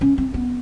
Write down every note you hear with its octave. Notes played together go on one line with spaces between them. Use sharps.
C#4
C4
B3